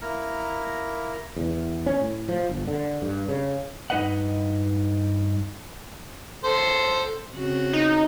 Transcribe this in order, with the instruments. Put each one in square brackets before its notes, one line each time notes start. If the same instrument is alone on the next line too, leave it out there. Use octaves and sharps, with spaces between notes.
[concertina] A#3 E4 A#5 F6
[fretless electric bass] E2
C#4
A2
F3
G1
D3
G2
C#3
[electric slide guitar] G2 D#4 B4 D#5 F#5
[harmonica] A4 C5
[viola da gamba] C#3 C4 F#4
[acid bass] D#4